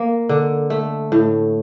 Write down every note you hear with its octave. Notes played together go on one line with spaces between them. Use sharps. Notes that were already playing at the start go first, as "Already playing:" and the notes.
Already playing: A#3
D3
A3
A2